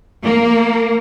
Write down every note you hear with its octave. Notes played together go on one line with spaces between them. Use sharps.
A#3